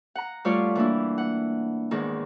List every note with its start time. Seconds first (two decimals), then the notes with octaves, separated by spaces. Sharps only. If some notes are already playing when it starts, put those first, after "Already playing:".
0.15 F#5 A#5
0.45 G3 A3 F4 G4 C#5 D5
0.75 E3 A#3 D4 E4
1.18 F#5
1.91 E2 G#2 D#3